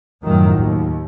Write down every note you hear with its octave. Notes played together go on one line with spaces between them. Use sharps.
F#2 A2 D#3 F3 F#3
D#2